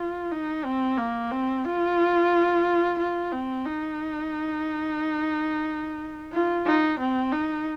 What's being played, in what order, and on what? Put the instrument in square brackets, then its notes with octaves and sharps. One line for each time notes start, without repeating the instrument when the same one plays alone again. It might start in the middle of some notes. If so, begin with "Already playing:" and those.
Already playing: [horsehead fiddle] F4
D#4
C4
A#3
C4
F4
F4
C4
D#4
F4
D#4
C4
D#4